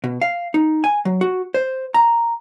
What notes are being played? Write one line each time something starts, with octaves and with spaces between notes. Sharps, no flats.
B2
F5
D#4
G#5
F#3
F#4
C5
A#5